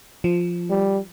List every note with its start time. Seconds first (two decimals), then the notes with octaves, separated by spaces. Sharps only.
0.24 F3
0.71 G3